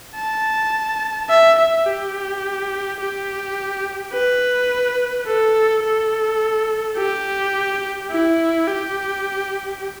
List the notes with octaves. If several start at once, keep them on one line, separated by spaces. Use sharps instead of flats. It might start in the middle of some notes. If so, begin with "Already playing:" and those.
A5
E5
E5
G4
G4
B4
A4
A4
G4
E4
G4